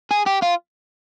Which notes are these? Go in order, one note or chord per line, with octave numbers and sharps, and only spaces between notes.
G#4
G4
F4